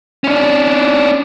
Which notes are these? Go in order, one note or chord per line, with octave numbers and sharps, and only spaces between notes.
C#4 D4